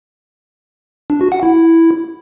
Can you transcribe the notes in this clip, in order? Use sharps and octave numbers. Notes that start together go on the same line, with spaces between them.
D4
F#4
F#5
E4